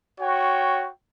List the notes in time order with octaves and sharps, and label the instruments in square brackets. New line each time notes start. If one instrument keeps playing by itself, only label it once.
[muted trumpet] F#4 [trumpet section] C#5 G5